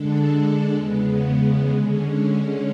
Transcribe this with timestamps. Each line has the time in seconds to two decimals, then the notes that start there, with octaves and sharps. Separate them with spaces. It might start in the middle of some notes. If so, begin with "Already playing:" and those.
Already playing: D3 G#3 D4 A4
0.71 E2 C#3 G#3 B3
1.68 D3 G#3 C#4